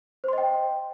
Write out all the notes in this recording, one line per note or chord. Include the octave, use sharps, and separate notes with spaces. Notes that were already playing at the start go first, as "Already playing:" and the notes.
C5 D#5 G5 C6